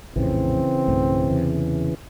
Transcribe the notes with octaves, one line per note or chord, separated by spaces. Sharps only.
A#1 F2 A2 C#3 E3 C4
B1 G2 A3
E2 C3